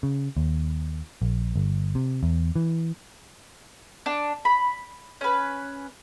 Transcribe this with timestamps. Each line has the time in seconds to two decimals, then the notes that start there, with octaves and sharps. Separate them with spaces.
0.03 C#3
0.37 D#2
1.22 A#1
1.56 G1
1.95 C3
2.23 E2
2.56 E3
4.06 D4
4.45 B5
5.21 C#4 B4